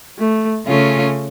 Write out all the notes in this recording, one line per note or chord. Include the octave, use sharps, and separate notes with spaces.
A3
C#3 A3 C#4 F4